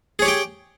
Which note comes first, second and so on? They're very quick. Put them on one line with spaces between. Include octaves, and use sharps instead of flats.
G#4 C#5 G4 G5